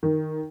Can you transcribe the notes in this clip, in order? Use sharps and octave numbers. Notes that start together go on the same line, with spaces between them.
D#3